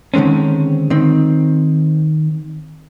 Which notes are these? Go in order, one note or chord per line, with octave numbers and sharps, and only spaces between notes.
D3 D#3 G#3 C4 C#4
D#3 C4